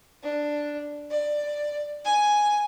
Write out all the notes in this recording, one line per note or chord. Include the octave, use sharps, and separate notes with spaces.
D4
D5
G#5